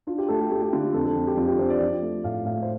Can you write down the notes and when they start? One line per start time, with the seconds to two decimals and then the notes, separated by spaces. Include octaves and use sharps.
0.07 D4 F4
0.18 G4
0.28 A3 A4
0.40 G4
0.50 A3 G4
0.62 G4
0.73 D3 F4
0.93 F2 A4
1.05 A4
1.15 F2
1.27 G4
1.37 F2 F4
1.48 G4
1.58 F2 C5
1.70 D5
1.81 F3
2.02 A3
2.24 A2 F5
2.45 A2 F5
2.62 C5